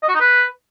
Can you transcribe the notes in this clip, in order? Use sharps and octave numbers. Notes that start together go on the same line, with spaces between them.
D#5
F#4
D#4
B4